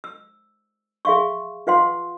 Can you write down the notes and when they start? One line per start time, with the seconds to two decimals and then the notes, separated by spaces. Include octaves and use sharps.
0.04 E6
1.05 G#4 E5 F5 C6 C#6
1.67 F4 B4 F5 F#5 C6